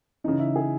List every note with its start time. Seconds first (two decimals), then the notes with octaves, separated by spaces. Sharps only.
0.24 C#3 E3 D#4
0.39 E4
0.56 G#4